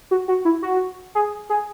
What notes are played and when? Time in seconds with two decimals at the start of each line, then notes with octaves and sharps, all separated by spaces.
0.11 F#4
0.28 F#4
0.45 E4
0.62 F#4
1.15 G#4
1.50 G#4